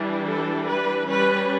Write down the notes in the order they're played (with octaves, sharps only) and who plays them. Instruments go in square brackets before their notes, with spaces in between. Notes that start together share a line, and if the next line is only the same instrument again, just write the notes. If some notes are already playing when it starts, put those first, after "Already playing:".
Already playing: [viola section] E3 G3 D4
A4
B4
G3 C#4 B4